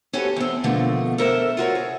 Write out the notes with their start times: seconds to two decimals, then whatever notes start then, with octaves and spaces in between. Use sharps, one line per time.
0.13 C#4 F#4 G4 A4 B4 C5
0.36 E2 C4
0.64 B2 D3 F3 A3 A#3
1.18 A4 A#4 C5 E5
1.57 F4 F#4 A#4 C#5
1.75 G#4